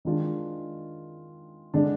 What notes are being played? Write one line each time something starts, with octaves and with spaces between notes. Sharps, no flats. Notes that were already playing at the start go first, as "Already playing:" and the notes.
D#3 G#3 D4 F4
D3 G#3 D4